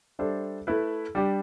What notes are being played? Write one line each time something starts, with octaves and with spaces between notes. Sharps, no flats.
G3 D4 A4 C5 E5
A3 E4 B4
G3 D4 G4